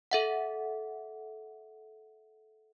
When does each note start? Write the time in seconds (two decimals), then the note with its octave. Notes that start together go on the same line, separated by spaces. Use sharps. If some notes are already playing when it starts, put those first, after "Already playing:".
0.11 A4 E5 F#5